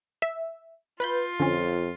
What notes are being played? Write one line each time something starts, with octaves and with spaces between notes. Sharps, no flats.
E5
F4 B4 B5 G6
F2 D3 C#4